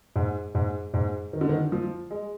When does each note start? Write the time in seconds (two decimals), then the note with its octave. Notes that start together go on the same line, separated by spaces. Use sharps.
0.16 G#2
0.55 G#2
0.94 G#2
1.33 D#3
1.41 D3
1.49 D#3
1.72 F3
2.11 G#3